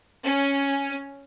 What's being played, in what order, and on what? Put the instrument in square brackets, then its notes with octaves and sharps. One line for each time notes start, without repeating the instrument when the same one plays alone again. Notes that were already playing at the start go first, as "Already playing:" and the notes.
[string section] C#4